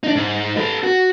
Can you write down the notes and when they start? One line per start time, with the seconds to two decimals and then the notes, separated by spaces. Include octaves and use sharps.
0.04 D4 D#4
0.15 G#2
0.57 A4 B4
0.83 F#4